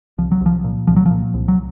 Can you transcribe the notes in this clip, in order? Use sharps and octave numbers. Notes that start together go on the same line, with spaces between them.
C2 F3
F#3
C2
F3
A#2
C2 F3
F#3
F3
A#2
C2
F#3